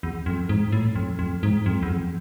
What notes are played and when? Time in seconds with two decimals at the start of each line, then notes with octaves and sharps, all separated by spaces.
0.03 E2
0.26 F2
0.49 G#2
0.72 A2
0.95 F2
1.19 F2
1.43 G#2
1.66 F2
1.83 E2
1.89 F2